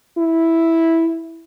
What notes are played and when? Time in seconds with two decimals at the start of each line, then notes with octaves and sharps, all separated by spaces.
0.18 E4